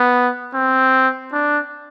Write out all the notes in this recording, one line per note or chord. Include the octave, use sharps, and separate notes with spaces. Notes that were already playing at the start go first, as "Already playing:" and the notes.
Already playing: B3
C4
D4